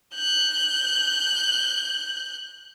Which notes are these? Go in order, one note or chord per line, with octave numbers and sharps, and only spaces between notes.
F#6 G6